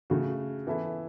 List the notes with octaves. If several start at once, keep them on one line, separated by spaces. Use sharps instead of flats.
C#3 A3 F#4
E3 B3 E4 A4 E5